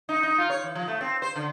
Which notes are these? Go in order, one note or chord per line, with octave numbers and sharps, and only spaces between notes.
D#4
D#4
F4
C#5
E3
F3
A3
C4
C5
D3